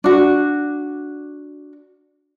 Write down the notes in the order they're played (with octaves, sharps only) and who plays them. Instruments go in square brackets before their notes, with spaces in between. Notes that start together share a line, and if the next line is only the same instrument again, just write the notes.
[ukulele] D4 F#4